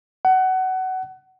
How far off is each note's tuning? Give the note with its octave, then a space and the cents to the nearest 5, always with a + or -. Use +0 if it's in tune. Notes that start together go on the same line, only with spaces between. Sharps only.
F#5 +20